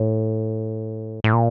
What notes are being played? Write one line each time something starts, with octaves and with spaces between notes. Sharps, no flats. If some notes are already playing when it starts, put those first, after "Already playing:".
Already playing: A2
A2
A#2